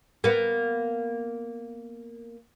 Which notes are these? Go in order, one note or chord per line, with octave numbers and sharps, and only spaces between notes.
A#3 B3